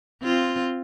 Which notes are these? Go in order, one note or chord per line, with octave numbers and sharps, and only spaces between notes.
C4 F4